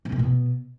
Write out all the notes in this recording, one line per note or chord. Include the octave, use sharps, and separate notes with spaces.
C3
A#2
B2